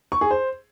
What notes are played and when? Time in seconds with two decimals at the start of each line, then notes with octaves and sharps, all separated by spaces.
0.12 C#6
0.21 G#4
0.31 C5